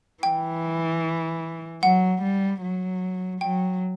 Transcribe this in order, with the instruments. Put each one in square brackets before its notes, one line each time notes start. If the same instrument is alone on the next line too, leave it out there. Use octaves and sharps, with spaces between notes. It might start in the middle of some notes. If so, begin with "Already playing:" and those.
[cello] E3 [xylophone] G5
[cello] F#3 [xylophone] F#5
[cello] G3
F#3
[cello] F#3 [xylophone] G5